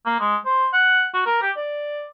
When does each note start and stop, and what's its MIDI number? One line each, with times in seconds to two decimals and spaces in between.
0.06 0.17 58
0.20 0.36 56
0.45 0.67 72
0.73 1.07 78
1.14 1.21 66
1.26 1.38 70
1.42 1.51 67
1.56 2.06 74